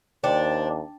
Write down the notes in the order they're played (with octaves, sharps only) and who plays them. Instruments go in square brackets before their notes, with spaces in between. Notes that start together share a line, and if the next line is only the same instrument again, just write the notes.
[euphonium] D#2 [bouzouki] D4 [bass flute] C5 [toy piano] G5